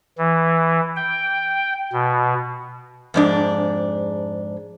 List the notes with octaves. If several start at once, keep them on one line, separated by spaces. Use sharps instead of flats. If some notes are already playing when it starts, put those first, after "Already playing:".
E3
G5
B2
F2 G#2 D4